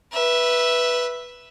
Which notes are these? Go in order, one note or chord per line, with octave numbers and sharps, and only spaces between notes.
B4 E5